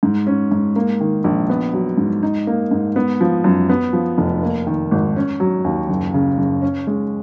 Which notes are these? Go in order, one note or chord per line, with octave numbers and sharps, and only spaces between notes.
G#2
C#4
G#2
A#3
D#3
A#1
B3
F#3
G#2
D#4
A#3
G#2
B3
F3
F#2
B3
F3
F1
A#3
D#3
G#1
C#4
F#3
D#2
F#1
C#3
F#1
C#4
G#3